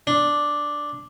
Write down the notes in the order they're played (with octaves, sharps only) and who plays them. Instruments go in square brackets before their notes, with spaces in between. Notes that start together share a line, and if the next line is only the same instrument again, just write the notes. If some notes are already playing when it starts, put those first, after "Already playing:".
[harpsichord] D4